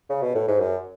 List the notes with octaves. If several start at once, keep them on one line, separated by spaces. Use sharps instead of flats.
C#3
B2
A2
G#2
F#2